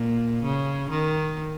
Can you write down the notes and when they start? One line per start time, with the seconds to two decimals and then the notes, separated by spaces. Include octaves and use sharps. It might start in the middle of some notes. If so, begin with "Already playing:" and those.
Already playing: A#2
0.43 C#3
0.90 D#3